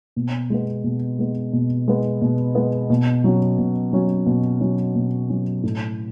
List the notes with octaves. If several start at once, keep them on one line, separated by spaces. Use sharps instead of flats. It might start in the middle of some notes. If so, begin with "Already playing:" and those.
B2
G#3 B3
B2
G#3 B3
B2
G#3 B3
B2
G#3 B3
B2
F#3 C#4
B2
F#3 C#4
B2
F#3 C#4
B2
F#3 C#4
A2